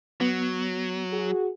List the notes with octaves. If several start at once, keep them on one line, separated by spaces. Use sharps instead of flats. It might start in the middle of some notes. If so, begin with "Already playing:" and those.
F#3 B3
F#4 G#4